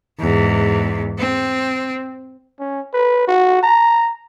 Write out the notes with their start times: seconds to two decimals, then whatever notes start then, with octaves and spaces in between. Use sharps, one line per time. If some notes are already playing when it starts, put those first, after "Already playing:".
0.20 E2 G#2
1.19 C4
2.59 C#4
2.94 B4
3.28 F#4
3.63 A#5